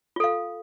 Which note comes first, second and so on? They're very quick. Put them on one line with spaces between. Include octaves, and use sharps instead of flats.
F4 A4 F5